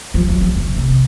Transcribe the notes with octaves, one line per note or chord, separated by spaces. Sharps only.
F3
F#3
F3
C#3
C3